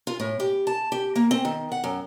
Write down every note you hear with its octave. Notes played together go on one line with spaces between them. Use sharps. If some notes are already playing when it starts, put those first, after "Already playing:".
F4
A2
G4
A5
G4
A#3
C4
D#3
F#5
F#2